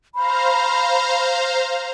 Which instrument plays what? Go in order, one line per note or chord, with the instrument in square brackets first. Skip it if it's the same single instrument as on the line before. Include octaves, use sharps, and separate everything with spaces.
[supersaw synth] C5 F5 A#5 [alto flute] B5